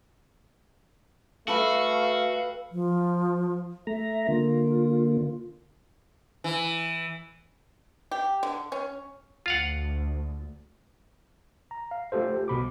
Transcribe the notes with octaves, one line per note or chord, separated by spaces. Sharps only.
A3 F#4 A4 B4 F5 G5
F3
A3 E5 A#5
D3 A#3 F4
E3
G4
D3
C#4
D2 F4 F5 F#5
A#5
F5
A3 F4 G4 A4 C5
C2 B2 B5 D6